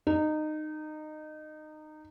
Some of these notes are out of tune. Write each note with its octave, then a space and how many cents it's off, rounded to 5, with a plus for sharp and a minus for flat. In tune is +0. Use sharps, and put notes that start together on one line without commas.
D#4 -20